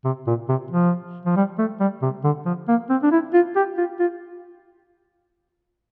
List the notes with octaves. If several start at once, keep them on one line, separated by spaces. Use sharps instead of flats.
C3
A#2
C3
F3
F3
G3
A3
G3
C3
D3
F3
A#3
C4
D4
E4
F4
G4
F4
F4